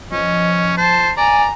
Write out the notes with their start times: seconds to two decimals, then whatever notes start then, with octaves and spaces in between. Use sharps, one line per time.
0.11 F3 C#4 D#5
0.77 C5 A5
1.17 D5 G#5 A#5